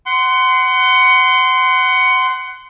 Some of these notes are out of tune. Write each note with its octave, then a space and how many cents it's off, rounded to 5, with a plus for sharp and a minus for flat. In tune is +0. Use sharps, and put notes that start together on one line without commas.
F#5 +15 C6 -15